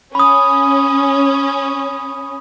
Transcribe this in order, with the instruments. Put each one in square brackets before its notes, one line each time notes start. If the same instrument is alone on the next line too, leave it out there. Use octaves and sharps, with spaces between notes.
[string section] C#4 [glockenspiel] B5 D#6